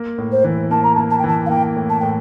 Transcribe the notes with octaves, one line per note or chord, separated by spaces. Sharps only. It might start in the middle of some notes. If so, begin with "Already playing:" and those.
Already playing: A#3
A2
C5
E3
A#3 A5
A#5
A5
A#3
A5
G5
E3 A5
F5
A#3 G5
A2
A5
A2 G5